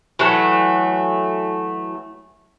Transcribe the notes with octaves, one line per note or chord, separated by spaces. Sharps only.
E3 F#3 A3 F#5